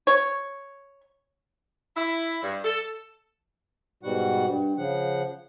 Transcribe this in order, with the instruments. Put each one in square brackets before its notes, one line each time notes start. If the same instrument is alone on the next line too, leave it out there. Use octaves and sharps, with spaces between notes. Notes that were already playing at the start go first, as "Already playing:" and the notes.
[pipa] C#5
[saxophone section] E4
G2
A4
[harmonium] G#2 B2 G3 F#4 F#5
G2
C#3 F3 F#5